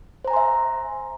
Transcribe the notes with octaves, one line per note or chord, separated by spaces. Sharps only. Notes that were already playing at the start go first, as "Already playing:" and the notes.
C5 E5 G#5 A#5 C6